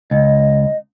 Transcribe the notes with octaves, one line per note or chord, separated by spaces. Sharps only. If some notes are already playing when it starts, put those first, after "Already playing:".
C#2 D#5